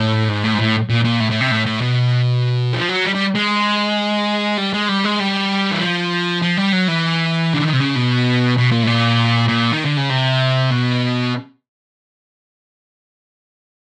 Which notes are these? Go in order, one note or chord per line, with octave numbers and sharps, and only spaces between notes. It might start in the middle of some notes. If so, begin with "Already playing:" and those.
Already playing: A2
G#2
A2
G#2
A2
A#2
A#2
A2
A2
C3
A2
A2
B2
F3
F#3
G3
G3
G#3
G3
G#3
G3
G#3
G3
E3
F3
F3
G3
F#3
E3
D3
D#3
C3
C#3
B2
B2
A#2
A2
A#2
A#2
D#3
D3
C#3
C3
B2